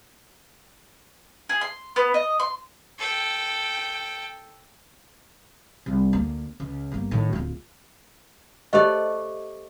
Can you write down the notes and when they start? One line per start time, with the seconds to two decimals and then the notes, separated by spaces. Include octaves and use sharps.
1.49 G#4
1.61 C6
1.96 B3
2.14 D#5
2.40 C6
2.98 A4 G5
5.86 C2
6.13 D2 A#3
6.60 C#2
6.92 G1 A#3
7.11 A2 D#3
7.33 D1 F4
8.73 A3 G4 C5 D5 D#5